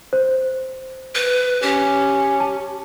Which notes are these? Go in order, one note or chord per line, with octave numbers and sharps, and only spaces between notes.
C5
B4
C#4 G4
A5